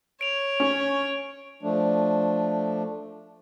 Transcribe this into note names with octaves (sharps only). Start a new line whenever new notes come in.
C#5 D7 F7
C#4
F3 A3 D4